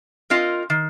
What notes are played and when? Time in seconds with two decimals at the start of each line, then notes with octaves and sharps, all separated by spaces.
0.30 C4 F4 A#4 D#5
0.70 D#3